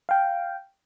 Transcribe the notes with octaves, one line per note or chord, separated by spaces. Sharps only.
F5 G5